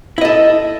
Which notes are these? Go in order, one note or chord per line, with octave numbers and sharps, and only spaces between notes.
E4 A4 D#5